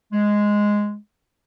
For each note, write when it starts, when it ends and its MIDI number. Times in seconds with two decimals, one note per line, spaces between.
0.13 0.96 56